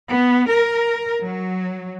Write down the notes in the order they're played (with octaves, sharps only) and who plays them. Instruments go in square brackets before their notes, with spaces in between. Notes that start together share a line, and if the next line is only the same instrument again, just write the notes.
[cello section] B3
A#4
F#3